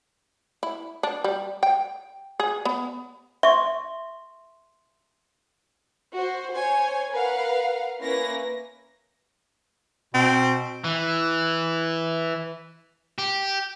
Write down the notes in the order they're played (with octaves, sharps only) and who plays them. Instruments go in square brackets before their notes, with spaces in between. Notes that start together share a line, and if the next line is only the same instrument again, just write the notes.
[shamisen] E4
D4
G3
G5
G#4
B3
[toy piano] E5 [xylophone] C6 C#6
[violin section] F#4 C5
C5 C#5 G#5
A#4 B4 F5 F#5
A#3 C#4 E4 B4 A#6
[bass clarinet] B2 [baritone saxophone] C4
[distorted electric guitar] E3
G4